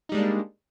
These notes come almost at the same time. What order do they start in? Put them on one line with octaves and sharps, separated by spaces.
D#4 G3 G#3 D4 A#3